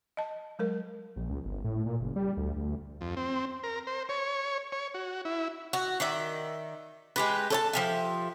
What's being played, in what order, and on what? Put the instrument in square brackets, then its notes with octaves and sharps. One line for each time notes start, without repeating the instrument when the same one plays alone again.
[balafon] D#5 A5
F#3 G#3 A#4
[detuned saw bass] A#1
C#2
G1
A2
A#2
F#1
G3
D2
D2
[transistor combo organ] F2
C4
A#4
C5
C#5
C#5
F#4
E4
[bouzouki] F#4
D#3 D5 E5
G#3 G4 B4
A4 C#5 A5
F3 G4 E5